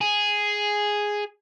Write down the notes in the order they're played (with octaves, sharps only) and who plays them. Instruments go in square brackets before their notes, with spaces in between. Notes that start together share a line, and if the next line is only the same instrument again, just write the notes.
[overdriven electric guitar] G#4